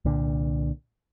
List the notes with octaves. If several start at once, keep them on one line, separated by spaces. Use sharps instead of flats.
C2 A#2 D3